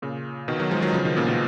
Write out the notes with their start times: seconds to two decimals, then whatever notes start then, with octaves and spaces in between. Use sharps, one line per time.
0.02 A#2 C#3
0.48 B2 D#3
0.60 D#3 F#3
0.71 F3 G#3
0.82 D#3 F#3
0.94 C#3 F3
1.05 B2 D#3
1.17 A#2 C#3
1.28 B2 D#3